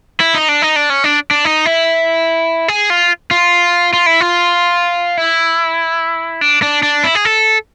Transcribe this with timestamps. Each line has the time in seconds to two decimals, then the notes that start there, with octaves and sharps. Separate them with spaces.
0.20 E4
0.35 D#4
0.49 D4
0.62 D#4
0.76 D4
0.90 C#4
1.04 D4
1.31 D4
1.45 D#4
1.66 E4
2.68 G#4
2.90 F4
3.31 F4
3.93 F4
4.06 E4
4.21 F4
5.17 E4
6.41 D4
6.62 D4
6.83 D4
7.04 E4
7.15 G#4
7.25 A4